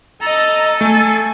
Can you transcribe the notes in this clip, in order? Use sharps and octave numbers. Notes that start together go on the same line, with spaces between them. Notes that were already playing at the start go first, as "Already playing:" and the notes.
A4 D#5 A#5
A3 G#5